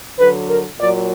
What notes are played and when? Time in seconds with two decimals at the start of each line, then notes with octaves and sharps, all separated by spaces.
0.18 D3 F#3 B4
0.48 A#4
0.78 A#2 F#3 D5